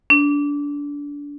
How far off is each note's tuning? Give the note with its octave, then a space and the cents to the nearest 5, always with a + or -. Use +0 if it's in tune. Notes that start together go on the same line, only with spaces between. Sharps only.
D4 -25